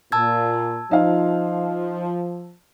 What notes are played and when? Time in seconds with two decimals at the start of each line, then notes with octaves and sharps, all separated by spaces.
0.12 A#2 A5 E6 G#6
0.91 F3 D#4 F5